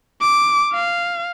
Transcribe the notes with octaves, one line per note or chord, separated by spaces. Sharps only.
D6
F5